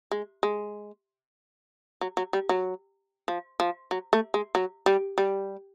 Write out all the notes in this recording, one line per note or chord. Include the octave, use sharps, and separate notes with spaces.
G#3
G#3
F#3
F#3
G3
F#3
F3
F3
F#3
A3
G#3
F#3
G3
G3